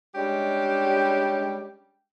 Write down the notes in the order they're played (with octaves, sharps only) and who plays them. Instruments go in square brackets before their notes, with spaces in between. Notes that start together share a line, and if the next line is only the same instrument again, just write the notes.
[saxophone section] G3 G#3 C#4 D4 G4